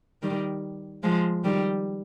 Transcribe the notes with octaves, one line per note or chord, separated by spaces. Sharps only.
D#3 G3
F3 G#3
D#3 G3